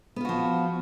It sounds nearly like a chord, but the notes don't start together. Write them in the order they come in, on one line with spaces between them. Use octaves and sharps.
B3 F4 F#4 F3